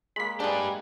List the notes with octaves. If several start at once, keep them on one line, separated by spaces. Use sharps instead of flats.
G#3 A#3 B5 B6
D4 G4 G#4 B4